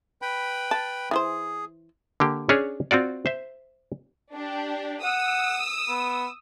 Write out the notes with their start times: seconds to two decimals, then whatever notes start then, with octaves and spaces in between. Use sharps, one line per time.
0.22 B4 G5 B5
0.71 A5
1.11 E3 E4 G#4 C5
2.20 D3 A#3 G4
2.49 C#4 D4 G#4 C#5
2.91 C4 F4 F#4 D5
3.26 C5 E5
4.34 D4 G4
5.03 F#5 D#6 E6
5.88 B3